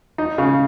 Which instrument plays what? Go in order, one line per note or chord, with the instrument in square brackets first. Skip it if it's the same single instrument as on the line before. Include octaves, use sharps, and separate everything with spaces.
[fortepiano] D#4
C#3